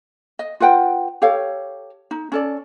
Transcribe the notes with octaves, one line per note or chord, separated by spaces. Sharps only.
D#5
F4 B4 F#5 G5
G4 A4 C#5 F5
D#4
C#4 A4 D5